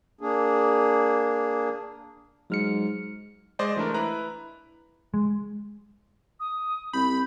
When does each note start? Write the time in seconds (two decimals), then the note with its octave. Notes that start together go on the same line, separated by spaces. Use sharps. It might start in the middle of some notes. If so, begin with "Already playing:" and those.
0.21 A#3 D4 G#4
2.50 G#2 F#3 F6 C#7
3.59 G#3 C5 D5 D#5
3.76 E3 A3 D4 A#4
3.94 E4 B4 A#5 F#6
5.14 G#3
6.40 D#6
6.93 C2 B5 G6